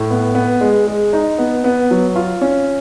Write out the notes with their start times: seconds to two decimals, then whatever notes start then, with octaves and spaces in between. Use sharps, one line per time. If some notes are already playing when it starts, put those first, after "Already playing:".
Already playing: A2
0.10 B3
0.35 B3
0.61 G#3
0.87 G#3
1.13 D#4
1.38 B3
1.64 B3
1.91 F#3
2.16 F4
2.41 C#4